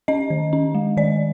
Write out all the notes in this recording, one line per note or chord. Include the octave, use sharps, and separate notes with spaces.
C#4 D#5
D#3
C#4
G#3
D#3 D5